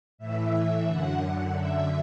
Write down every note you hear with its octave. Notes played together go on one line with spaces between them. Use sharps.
A2 E3 E5
F#2 D3 F#5
F#5
F#2 D3 E5